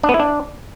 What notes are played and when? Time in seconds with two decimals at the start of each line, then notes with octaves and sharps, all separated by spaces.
0.03 D4
0.09 B3
0.14 E4
0.20 D4